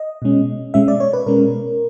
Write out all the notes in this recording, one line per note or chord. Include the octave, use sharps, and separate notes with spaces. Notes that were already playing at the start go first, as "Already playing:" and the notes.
Already playing: D#5
B2 G#3 C#4
B2 G#3 C#4 E5
D5
C#5
B4
B2 G#3 C#4 A#4